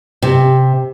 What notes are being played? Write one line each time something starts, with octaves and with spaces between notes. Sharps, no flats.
C3